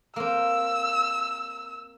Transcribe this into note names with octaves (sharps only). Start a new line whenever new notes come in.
A#3 C4 E6